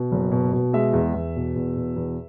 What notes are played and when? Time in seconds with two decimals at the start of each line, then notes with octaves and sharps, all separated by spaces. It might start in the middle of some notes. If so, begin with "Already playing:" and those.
Already playing: B2
0.12 F#1
0.32 B2
0.53 B2
0.73 G#3 E5
0.93 E2
1.14 E2
1.36 B2
1.56 E2
1.77 B2
1.96 E2